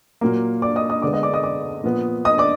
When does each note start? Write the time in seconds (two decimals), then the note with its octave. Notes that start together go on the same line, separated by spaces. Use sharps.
0.21 A#2 F#3 A#3
0.62 D5 D6
0.76 D#5 D#6
0.90 D#5 D#6
1.02 D3 G#3 B3 D5 D6
1.13 D#5 D#6
1.23 D5 D6
1.34 D#5 D#6
1.43 D5 D6
1.84 A#2 F3 B3
2.25 D#5 D#6
2.38 D5 D6